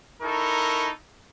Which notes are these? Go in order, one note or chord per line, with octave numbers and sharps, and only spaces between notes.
D#4 E4 A4 A#4 C#6